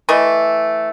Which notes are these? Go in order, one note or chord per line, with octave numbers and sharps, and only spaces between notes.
E3 A3 D#5